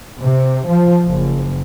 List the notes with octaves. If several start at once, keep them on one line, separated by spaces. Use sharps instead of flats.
C3
F3
F#1